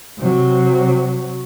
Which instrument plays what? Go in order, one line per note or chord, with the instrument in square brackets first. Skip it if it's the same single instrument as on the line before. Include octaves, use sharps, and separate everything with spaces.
[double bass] C3 F#3